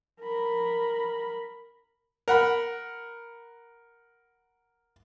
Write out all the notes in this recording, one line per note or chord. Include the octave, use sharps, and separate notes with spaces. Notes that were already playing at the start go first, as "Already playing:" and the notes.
A#4 B5
A#4 F#5 B5